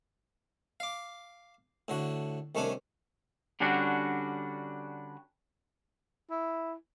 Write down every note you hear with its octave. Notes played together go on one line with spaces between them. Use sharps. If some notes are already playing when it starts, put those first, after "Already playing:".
F5 D6
A2 D3 F#4
C2 D#3 A3 C#4 D4 G#5
D3 G3 C#4 D4 F#4
E4